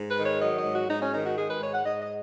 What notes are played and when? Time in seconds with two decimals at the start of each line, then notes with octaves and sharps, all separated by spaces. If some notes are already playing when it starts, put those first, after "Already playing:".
Already playing: G#2
0.09 B4
0.16 D#3
0.24 C#5
0.40 F#3 D#5
0.57 D#5
0.65 G#2
0.72 F#4
0.88 G#2 D#4
1.01 C#4
1.12 D#3 D#4
1.24 F#4
1.36 G#3 G#4
1.49 B4
1.60 G#2 C#5
1.72 F#5
1.84 G#2 D#5
2.01 D#5